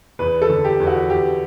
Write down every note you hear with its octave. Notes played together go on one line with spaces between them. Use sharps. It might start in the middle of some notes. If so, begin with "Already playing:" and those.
E2 B4
A4
D3
G4
E2
F#4
E2 G4